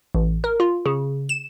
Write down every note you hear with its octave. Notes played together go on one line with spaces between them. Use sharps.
A1
A#4
F4
C#3
E7